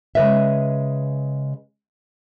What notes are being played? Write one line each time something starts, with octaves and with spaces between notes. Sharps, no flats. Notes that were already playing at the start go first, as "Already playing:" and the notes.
C#3 G#3 B4 D#5 E5